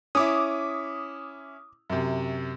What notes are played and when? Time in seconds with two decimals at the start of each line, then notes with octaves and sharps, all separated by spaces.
0.15 C#4 E4 D6 D#6
1.90 F#2 C3